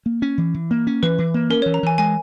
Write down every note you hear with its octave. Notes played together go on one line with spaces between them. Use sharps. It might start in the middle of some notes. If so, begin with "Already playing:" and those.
A#3
C#4
E3
E3
A#3
C#4
E3 B4
E3
A#3
C#4 A#4
C#5
E3
A#5
E3 G#5
G#3 G#5